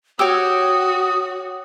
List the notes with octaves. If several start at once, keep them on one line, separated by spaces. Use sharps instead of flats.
F#4 G4 C#5 G5 D#6 E6